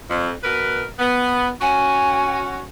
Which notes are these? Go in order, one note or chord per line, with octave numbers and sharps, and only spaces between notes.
F2
B2 A#4 B4
B3
C#4 F#4 G#5